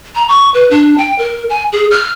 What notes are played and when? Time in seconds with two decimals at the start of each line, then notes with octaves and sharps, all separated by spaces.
0.15 A#5
0.29 C#6
0.54 B4
0.71 D4
0.98 G5
1.18 A#4
1.50 G#5
1.72 G#4
1.91 F6